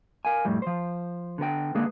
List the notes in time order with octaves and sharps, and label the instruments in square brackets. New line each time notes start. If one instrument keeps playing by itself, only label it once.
[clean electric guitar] A#4 F5 G#5
F2 A2 G3
F3 C5
D3 B3 A#4 G5
D3 G#3 A#3 G#4 B4